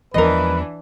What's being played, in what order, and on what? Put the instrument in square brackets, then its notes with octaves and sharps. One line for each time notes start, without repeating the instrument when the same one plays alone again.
[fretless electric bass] E2 F3 G#3 [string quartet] E3 D4 [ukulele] A#4 D#5 [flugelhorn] B4